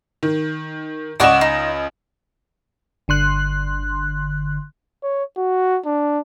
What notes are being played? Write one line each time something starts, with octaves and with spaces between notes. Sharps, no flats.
D#3
C#2 D5 D#5 F#5 C#6 E7
D#4
G1 D3 C6 F#6
C#5
F#4
D4